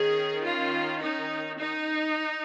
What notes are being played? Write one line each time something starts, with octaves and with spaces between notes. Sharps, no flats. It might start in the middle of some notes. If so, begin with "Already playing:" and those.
Already playing: D#3 C#4 G#4
F4
D#4
D#4